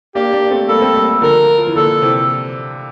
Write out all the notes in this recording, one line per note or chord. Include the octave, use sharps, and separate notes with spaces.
A#3 D4 G4
A#3 D4
A3 C4
G3 A#3 A4
A3 C4
G3 A#3
D3 F3 A#4
F3
E3
A#2 D3 A4
C3 E3